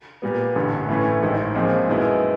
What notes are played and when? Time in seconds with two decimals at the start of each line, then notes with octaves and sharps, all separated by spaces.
0.22 A#2 G3 B3
0.55 A1 G2 D3
0.89 A2 E3 A3 C#4
1.22 A1 G#2 D#3
1.55 A#1 A#2 F3 G#3 C4
1.88 F#2 D#3 G#3 B3 E4